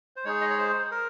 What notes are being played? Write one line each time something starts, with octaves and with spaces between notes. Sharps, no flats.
C5
G#3 D#4 G#4 C#5
D#5
C#5
C5
A#4